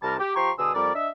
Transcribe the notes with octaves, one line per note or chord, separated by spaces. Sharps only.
C2 C3 G3 A#4 A5
G4
F3 G4 A#5 C6 C#6
B2 D3 G#4 D#6 E6
F2 G3 A#4 D5
D4 D#5 E5